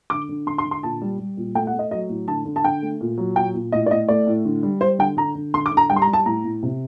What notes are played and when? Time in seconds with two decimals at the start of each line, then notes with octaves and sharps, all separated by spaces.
0.10 D3 D6
0.29 D3
0.46 D3 C6
0.58 C6
0.65 D3
0.71 C6
0.83 A#2 A5
1.01 G3
1.19 G3
1.37 A#2
1.55 A3 G5
1.67 F#5
1.73 A3
1.79 D#5
1.91 F#3 D#5
2.09 A2
2.28 D3 A5
2.45 D3
2.56 A5
2.64 D3 G5
2.82 A3
3.01 A#2
3.18 F#3
3.36 A#2 G5
3.54 A#2
3.72 A2 D#5
3.86 D5
3.91 A2 D#5
4.08 A3 D5
4.27 A2
4.45 D3
4.63 G3
4.81 G3 C5
4.99 D3 G5
5.17 D3 A#5
5.35 D3
5.54 D3 C6
5.66 D6
5.71 D3
5.77 A#5
5.90 G3 G5
5.96 C6
6.02 A#5
6.07 G3
6.13 A5
6.26 A2 A#5
6.44 A2
6.63 C3